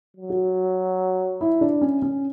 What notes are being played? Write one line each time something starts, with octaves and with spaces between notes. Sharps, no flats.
F#3
F#4
E4
D4
C#4
C#4